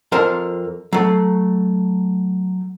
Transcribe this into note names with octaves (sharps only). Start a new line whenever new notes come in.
F2 A#4 C5 A5 A#5
F#3 A3